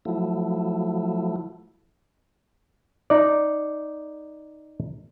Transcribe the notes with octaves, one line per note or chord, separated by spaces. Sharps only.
F3 F#3 A3 E4
D#4 D5